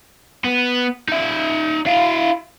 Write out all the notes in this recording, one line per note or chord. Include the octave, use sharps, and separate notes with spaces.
B3
D#4 E5
E4 F5